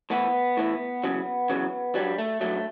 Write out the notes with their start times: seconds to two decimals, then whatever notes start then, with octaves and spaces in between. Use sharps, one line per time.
0.10 A2 E3 B3
0.57 A2 E3
1.04 E2 C#3 F#3
1.50 E2 C#3 F#3
1.95 G2 F#3 G3
2.18 A3
2.41 G2 F#3 A3